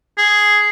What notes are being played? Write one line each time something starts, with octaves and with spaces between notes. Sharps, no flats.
G#4